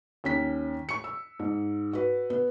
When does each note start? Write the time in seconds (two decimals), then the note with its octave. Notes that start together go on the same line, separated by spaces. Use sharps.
0.24 D#2 C#4 B6
0.89 C#6 C#7
1.04 E6
1.39 G#2
1.93 F#4 B4
2.30 B3